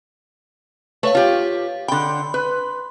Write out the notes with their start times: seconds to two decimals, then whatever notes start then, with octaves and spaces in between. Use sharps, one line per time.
1.03 A3 B4 C#5 F5
1.15 F4 G4
1.88 D3 G5 B5 C6
2.34 B4